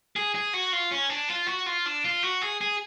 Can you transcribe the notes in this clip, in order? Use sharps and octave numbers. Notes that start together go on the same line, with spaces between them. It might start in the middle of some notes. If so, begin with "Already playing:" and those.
G#4
G#4
F#4
F4
C#4
D4
F4
F#4
F4
D4
F4
F#4
G#4
G#4